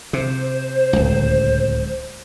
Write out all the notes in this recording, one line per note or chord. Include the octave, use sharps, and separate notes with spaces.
C3 C5
D1 C#2